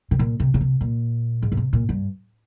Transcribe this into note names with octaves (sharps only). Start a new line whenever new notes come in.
C3
A#2
C3
C#3
C3
A#2
G#2
C#3
C3
A#2
G2